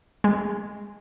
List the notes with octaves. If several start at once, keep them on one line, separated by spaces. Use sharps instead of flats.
G#3